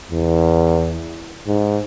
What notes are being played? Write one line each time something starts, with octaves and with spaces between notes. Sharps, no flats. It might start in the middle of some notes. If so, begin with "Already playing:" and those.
E2
G#2